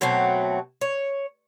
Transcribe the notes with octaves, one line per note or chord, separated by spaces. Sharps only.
B2 F#3 A3 C4
C#5